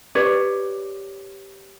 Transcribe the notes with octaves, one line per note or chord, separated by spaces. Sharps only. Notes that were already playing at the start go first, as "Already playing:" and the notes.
G4 B4 C#5 D5